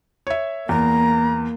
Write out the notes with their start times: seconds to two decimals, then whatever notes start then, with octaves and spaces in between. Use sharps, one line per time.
0.27 C#5 E5
0.69 E2 A#3 A#5